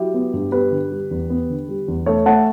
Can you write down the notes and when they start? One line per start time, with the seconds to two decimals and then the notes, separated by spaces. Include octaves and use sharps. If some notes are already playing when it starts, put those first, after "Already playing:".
Already playing: F#3 E4 G4
0.14 B3
0.33 G2
0.52 B3 G4 B4
0.71 D3
0.91 G3
1.11 E2
1.30 B3
1.50 D3
1.69 G3
1.88 E2
2.06 A3 A4 C#5
2.26 A3 F#5 A5